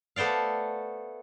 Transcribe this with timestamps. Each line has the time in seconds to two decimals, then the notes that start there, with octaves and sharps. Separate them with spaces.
0.16 A3 B3 C5 D5 F5